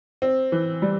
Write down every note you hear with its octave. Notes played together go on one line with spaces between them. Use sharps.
C4
E3
G3